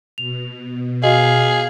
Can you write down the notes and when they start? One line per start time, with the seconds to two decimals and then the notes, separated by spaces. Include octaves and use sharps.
0.18 B2 F7
1.03 F#4 G#4 D#5 F5